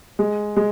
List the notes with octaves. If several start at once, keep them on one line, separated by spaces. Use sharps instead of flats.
G#3
G#3